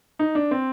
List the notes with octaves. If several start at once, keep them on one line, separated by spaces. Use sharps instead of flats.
D#4
D4
C4